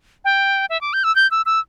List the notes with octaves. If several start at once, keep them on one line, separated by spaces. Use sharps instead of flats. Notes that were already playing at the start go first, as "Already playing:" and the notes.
G5
E5
D6
G6
E6
G6
E6
E6